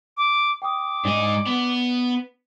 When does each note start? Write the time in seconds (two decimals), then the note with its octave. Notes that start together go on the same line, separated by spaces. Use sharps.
0.17 D6
0.62 G5 D6 D#6
1.05 G#2 D4 D5 D#5
1.46 B3